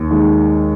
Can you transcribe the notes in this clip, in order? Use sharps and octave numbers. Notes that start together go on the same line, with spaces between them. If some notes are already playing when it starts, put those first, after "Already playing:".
Already playing: D#2
D#3 G#3